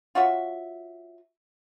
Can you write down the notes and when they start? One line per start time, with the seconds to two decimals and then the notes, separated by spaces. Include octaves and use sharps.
0.15 F4 F#4 C#5 E5